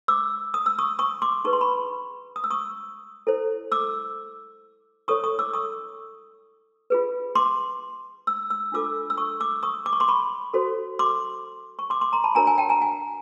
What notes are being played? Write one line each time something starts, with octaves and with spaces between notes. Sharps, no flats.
D6 E6
D#6
E6
C#6 D#6
C#6 D#6
C6 D6
D#4 G#4 B4 C#6
C6
B5 C#6
D#6
E6
C#6 D#6
E4 A4 C5
D6 E6
E4 A4 C#5 C#6 D#6
C#6 D#6
D6 E6
C#6 D#6
F4 G#4 B4
C6 D6
E6
E6
D4 F4 A4 D6 E6
E6
C#6 D#6
D6 E6
C#6 D#6
D6
C#6
C6 D6
B5 C#6
F#4 A4 C5
C6 D6
C#6
C6 D6
C6 D6
A#5 C6
A5 B5
D4 F#4 A#4 C#5 G#5 A#5
G#5 A#5
G5 A5
G#5 A#5
F#5 G#5